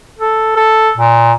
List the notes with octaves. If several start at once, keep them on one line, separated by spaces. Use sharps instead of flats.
A4
A4
A#2